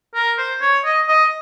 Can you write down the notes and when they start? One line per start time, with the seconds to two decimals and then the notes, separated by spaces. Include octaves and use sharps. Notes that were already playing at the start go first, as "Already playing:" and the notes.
0.15 A#4
0.38 C5
0.62 C#5
0.85 D#5
1.09 D#5